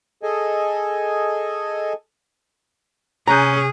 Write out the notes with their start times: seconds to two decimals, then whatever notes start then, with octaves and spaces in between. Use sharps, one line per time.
0.23 G#4 A4 D#5 G#5
3.28 C3 C#4 G#4 A#5 F#6 G6